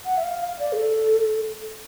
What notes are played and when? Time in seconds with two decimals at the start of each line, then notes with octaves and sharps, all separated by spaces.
0.05 F#5
0.17 E5
0.23 F5
0.41 F5
0.59 D5
0.73 G#4
0.76 A4